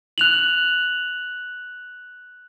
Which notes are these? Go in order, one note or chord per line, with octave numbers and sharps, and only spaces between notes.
F#6 F7 F#7